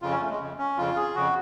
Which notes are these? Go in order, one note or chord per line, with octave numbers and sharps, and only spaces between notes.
F2 C#3 F4
C#4
A3
G#3
F2 C#3
C#4
F2 C#3 F4
G#4
F2 C#3 F#4